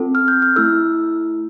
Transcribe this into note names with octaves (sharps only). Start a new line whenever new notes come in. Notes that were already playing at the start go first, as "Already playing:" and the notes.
Already playing: C4 F4 A4
F6
G6
F6
A3 E4 A4 E6